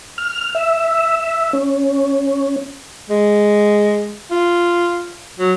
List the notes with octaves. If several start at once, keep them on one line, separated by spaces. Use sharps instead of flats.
F6
E5
C#4
G#3
F4
F#3